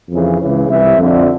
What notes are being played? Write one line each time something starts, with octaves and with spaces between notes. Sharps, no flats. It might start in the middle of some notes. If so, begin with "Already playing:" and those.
F2 C#3 E3
C#2 C#3 E3
C2 C3 E3 E5
F2 D3